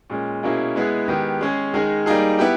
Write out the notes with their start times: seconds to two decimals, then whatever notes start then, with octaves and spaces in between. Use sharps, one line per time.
0.10 A#2 G#3 C#4
0.43 B2 A#3 C#4 E4 G#4
0.76 G#3 B3 E4 G#4
1.08 D#3 G#3 B3 G4
1.41 G#3 C#4 G#4
1.74 D#3 G#3 D#4 G#4
2.06 G3 A#3 D#4 G#4
2.39 B3 E4 G4